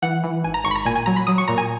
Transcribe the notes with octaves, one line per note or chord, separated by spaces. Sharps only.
E3 F#5
E3
G#1 G#5
A#5
G#1 C#6
B5
A#5
A#2 G#5
G#5
F#3 A#5
B5
F#3 D#6
C#6
A#2 A#5
G#5